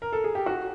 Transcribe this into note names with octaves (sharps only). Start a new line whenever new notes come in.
A#4
A4
G#4
G4
F#4